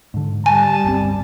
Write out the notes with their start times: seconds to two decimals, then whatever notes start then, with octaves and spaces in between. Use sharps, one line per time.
0.14 G#2 D3
0.46 G3 G#5 A5
0.84 G1 C#2 C4